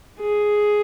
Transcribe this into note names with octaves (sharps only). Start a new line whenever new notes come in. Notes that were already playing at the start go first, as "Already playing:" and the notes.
G#4